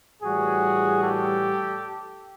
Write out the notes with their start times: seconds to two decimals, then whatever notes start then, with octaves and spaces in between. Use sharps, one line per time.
0.22 A2 E3 G3 F#4 G#4
1.03 G4 A4